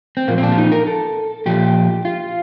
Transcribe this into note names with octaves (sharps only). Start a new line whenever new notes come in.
C4
A#2 F3 A#3
C4
D4
F4
D#4
A#4
A4
A#2 F3 G4
F4